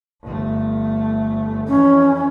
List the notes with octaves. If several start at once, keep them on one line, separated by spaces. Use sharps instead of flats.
G1 A3
F2 E3 C#4